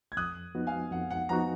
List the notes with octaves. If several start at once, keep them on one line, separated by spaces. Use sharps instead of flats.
G#6
F2 D#6 F#6
F3 B3 D#4 F#4
F5 G#5
F2 F#5
F#5
F3 B3 D#4 F#4 F#5 A#5